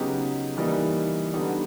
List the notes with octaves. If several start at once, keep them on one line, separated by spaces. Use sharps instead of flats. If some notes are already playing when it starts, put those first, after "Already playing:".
Already playing: C#3 F#3 B3 D#4 G4
E3 G3 A#3 D#4
D3 G3 B3 D#4 G4